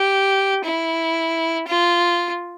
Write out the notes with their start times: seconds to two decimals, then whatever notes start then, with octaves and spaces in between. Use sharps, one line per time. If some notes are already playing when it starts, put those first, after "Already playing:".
Already playing: G4
0.64 E4
1.67 F4